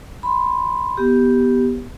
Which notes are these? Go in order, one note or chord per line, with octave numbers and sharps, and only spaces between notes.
B5 C6
B3 G4